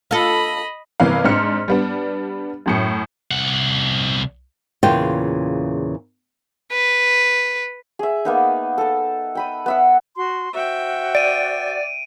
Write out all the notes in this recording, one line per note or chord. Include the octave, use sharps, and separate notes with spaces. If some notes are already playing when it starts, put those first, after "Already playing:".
F4 A4 D#5 B5
G1 C3 E3 A#3 B4 F5
G#2 C4 D4 C6 F6 C#7
G3 B3 D4
F#2 A2 C#7
C2 F#5
E2 A#2 C#3 F4 G5
B4
G#4 E5
A#3 B3 D#4
A4 A5
G5 B5 D#6
B3 E5 F#5
F#4 C6
F#4 C5 E5 F#5 G5
D5 D7 D#7